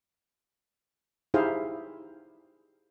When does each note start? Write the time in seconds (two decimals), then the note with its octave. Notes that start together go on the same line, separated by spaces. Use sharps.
1.34 D#4 E4 G4 G#4 C5 F5